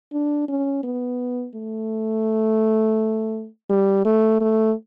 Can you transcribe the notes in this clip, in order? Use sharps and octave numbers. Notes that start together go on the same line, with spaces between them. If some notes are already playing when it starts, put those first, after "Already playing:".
D4
C#4
B3
A3
G3
A3
A3